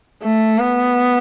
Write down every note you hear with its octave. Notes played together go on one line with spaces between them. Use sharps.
A3
B3